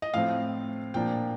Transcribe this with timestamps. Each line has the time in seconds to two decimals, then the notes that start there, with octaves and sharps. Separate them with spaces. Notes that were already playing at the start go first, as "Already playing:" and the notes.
0.02 D#5
0.14 A2 F3 A3 C4 F5
0.94 A#2 F3 A#3 D4 G5